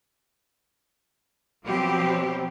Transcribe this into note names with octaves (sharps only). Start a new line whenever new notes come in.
B2 F3 F#3 C4 G4